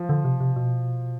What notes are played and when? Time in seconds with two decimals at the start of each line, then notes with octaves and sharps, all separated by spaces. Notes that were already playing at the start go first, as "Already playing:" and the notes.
Already playing: F3
0.09 D3
0.24 C3
0.40 C3
0.56 B2